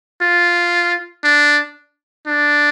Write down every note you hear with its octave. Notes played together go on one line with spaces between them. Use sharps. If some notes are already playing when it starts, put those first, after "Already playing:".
F4
D4
D4